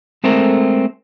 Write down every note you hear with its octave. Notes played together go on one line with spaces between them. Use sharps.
G#3 A3 C4 A4 A#4